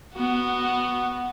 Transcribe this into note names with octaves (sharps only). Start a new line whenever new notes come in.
B3 F#4